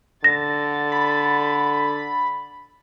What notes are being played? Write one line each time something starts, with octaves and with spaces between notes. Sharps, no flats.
D3 A6 A#6
B5